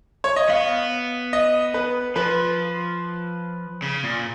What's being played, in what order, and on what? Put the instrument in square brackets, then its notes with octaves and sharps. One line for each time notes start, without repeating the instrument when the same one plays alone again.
[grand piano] C#5
D#5
[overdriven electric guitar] B3 [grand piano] F5
[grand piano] D#5
B4
[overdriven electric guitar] F3 [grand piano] B4
[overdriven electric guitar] C#3
A#2